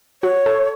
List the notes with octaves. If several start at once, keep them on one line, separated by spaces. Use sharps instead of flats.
F#4 C#5
A4